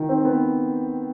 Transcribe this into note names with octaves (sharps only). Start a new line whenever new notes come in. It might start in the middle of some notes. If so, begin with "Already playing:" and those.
Already playing: D#3
C4
B3